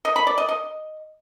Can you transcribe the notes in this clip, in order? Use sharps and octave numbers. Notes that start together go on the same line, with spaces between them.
D#5
B5
D5
D#5
D#5